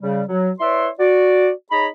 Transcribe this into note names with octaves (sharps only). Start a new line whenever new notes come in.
C#3 G3
F#3
E4 B4 C#5 D5 E5 C6
F#4 D5
D#4 G#4 C#5 A#5 B5